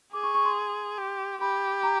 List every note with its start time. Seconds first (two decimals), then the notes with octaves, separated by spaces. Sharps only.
0.13 G#4 D6
0.23 C#6
0.34 C#6
0.45 C6
0.98 G4
1.41 G4 B5
1.83 A#5